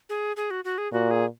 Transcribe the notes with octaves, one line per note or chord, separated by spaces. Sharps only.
G#4
G#4
F#4
F#4
G#4
A#2 F#4
G#4